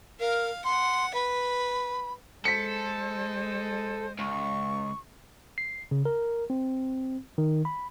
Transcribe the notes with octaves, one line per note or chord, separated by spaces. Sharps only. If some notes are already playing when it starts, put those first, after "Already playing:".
A#4 F5
F#5 C6
B4 B5
G#3 A4 C5 B6 C#7
C#2 C#6
C7
C#3
A#4
C4
D#3
B5